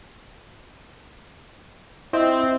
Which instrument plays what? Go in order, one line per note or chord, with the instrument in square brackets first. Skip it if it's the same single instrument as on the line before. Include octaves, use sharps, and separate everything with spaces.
[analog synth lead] C4 [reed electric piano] E4 D#5 E5